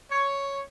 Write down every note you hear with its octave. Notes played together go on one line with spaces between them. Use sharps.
C#5